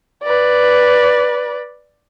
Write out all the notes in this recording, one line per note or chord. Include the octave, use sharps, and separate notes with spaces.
B4 D5